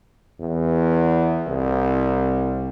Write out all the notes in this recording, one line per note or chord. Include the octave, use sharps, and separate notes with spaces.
E2
C2